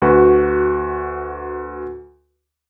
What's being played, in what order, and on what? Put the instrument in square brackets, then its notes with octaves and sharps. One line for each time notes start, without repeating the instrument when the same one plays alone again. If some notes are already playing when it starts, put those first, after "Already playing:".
[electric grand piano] D2 F#4 B4